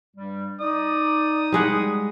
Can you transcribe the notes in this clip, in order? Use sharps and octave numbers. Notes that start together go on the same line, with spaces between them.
G2 G3
D#4 D5 D#6
G3 G#3 F#5